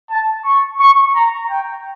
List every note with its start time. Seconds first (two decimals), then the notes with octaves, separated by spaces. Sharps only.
0.10 A5
0.45 C#6
0.79 C#6
1.15 A#5
1.50 G5